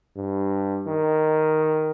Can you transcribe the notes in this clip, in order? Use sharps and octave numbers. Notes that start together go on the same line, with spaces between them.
G2
D#3